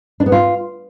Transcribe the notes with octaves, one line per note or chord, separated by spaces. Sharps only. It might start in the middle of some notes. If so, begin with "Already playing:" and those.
D4
B3
F4